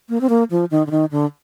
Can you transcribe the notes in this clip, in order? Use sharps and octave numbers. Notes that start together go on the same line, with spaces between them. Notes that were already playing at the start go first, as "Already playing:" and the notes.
A#3
C4
A#3
F3
D#3
D3
D#3
D3